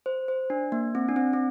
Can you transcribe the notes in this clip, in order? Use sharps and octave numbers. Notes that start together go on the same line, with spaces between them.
C5
C5
D4
A#3
C4
D4
C4
C4